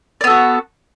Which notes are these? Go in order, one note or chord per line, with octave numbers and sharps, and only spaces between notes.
B3 F#4 A4 D5